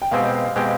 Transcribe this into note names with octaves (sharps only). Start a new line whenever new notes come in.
G5
B2 G#3 C4 G4 F5
B2 G#3 C4 G4